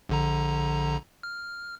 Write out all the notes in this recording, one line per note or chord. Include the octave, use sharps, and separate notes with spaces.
A#1 D3 A#5
F6